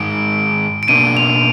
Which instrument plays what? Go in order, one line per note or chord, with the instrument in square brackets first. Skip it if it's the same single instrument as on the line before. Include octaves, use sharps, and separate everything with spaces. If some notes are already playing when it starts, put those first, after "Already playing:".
Already playing: [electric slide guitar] G#2 D#3 G#3 [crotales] D7
[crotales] D7
[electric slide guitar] B2 A#3 D4 [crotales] D#7
[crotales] F7